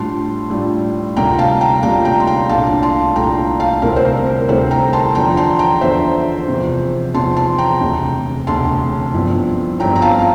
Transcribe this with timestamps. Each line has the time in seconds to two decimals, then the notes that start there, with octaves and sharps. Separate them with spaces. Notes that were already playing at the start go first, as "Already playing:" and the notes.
Already playing: A2 G3 D4 F4 A5 C6
0.50 A2 G3 D4 F4
1.16 D2 C3 G3 A#3 F4 G5 A#5
1.39 F5 A5
1.61 G5 A#5
1.83 D2 C3 G3 A#3 F4 G5 A#5
2.05 G5 A#5
2.20 C6
2.27 G5 A#5
2.49 C2 A#2 A3 D4 F5 A5
2.83 A5 C6
3.16 C2 A#2 A3 D4 G5 A#5
3.60 F5 A5
3.82 D2 C3 G3 C4 E4 A#4
3.96 C5
4.05 A#4
4.26 A#4
4.49 D2 C3 G3 C4 E4 A4 C5
4.71 G5 A#5
4.93 A5 C6
5.15 E2 D3 F3 G5 A#5
5.37 A5 C6
5.59 G5 A#5
5.81 E2 D3 F3 C5 E5
6.48 E2 C3 F3
7.14 E2 C3 F3 A5 C6
7.36 A5 C6
7.58 G5 A#5
7.81 E1 D2 C3
8.47 E1 D2 C3 A5 C6
9.14 G1 G2 F3 C4 E4
9.80 G1 G2 F3 C4 E4 G5 A#5
9.96 A#5
10.02 F5 A5
10.19 F5